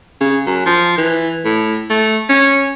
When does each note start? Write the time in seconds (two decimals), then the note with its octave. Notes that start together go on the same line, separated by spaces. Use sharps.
0.21 C#3
0.47 F#2
0.66 F3
0.98 E3
1.45 A2
1.90 A3
2.29 C#4